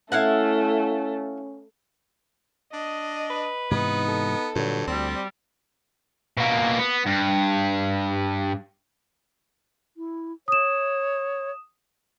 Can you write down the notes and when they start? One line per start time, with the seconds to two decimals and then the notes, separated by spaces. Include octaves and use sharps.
0.12 A3 C#4 E4 F5 F#5
2.73 D4 D#5
3.30 B4
3.71 G#2 C3 E3 B3 D#4
4.09 A4
4.56 G2 A#2 D3 F#3
4.88 D2 G3 C4
6.37 B2 A#3
6.79 B3
7.07 G2
9.97 E4
10.48 C#5 D#6 E7